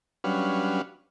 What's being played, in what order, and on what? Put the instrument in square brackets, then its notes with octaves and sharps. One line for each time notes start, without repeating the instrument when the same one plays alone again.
[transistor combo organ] F#3 G3 C#4 D4 B4 F5